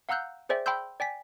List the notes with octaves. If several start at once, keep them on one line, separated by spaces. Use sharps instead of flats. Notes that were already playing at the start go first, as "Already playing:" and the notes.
F5 F#5 A#5 E6 F#6 G6
G#4 C5 D5 E5 G5
G5 B5 C6 E6 G6
D5 G5 G#5 B6